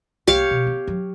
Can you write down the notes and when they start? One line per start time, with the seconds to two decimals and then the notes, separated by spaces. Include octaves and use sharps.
0.27 C2 A#3 G4 C#5 F5
0.51 B2
0.67 B3
0.87 F#3